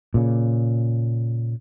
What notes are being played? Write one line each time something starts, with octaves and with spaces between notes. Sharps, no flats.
A#2 C#3